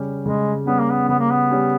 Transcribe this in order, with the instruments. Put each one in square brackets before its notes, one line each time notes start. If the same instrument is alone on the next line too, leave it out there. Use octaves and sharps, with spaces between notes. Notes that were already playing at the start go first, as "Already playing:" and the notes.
Already playing: [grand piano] C#3 G3 C#4 G4
[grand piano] C#3 [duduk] G#3
[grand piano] G3 C#4 G4 [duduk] B3
[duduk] A#3
B3
[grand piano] C#3 [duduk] B3
[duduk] A#3
B3
[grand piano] G3 C#4 G4